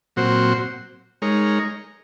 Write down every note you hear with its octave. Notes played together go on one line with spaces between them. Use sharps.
A#2 F#3 C4 F#4 C5
G#3 D#4 A#4 C#5